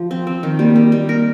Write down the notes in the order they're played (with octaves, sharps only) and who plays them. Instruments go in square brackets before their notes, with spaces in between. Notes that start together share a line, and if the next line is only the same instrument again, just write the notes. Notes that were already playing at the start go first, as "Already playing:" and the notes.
Already playing: [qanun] F3
C4
C4
D#3
[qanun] G3 [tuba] A#3
[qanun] G3
G3
A#4